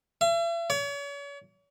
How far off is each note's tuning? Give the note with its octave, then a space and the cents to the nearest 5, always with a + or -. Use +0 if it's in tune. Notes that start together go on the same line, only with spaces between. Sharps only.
E5 +40
C#5 +40